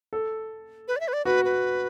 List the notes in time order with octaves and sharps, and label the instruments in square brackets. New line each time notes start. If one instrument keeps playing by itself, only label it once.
[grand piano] A4
[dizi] B4
D5
E5
B4
D5
[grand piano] F#4 [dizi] B4
[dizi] B4